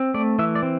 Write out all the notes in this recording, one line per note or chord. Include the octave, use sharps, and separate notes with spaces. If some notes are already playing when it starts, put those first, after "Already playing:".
Already playing: C4
A3 D5
E3 E5
D5
C4